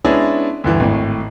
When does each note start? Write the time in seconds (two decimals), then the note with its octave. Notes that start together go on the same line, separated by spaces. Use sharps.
0.04 G#3 B3 C#4 D4 E4
0.64 D2 G2 E3
0.80 G#1 A2